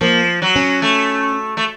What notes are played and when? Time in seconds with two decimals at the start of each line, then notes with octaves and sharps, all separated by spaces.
0.01 F3 A#3
0.42 F#3
0.56 C#4
0.82 A3
1.57 A3